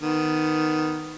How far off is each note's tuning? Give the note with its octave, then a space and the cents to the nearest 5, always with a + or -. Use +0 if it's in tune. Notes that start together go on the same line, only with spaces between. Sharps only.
D#3 +0 B3 +10